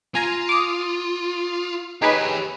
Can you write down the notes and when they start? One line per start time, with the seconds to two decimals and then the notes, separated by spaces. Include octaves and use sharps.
0.15 F4 G#5 A#5
0.49 D6 D#6
2.02 D#4 G4 G#4 B4 C#5